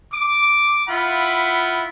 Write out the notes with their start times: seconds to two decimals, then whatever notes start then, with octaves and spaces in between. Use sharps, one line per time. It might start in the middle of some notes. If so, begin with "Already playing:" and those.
0.13 D6
0.88 E4 F4 F#5 B5